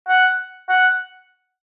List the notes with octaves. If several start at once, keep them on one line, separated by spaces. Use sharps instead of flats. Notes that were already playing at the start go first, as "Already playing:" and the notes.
F#5
F#5